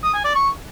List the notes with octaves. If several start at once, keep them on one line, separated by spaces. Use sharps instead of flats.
D#6
G#5
D5
C#6